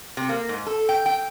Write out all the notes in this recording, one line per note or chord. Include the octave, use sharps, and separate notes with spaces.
C3
A#3
G#2
A4
G5
G5